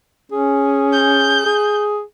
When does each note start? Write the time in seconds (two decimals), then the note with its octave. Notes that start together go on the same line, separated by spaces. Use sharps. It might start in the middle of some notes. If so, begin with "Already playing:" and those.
0.32 C#4 G#4
0.93 G6
1.46 G#4